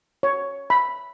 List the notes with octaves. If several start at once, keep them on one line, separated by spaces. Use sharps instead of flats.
C#5
B5